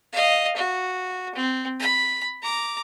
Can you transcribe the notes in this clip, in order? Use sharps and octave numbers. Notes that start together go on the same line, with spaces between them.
D#5 F5
F#4
C4
B5
A#5 D6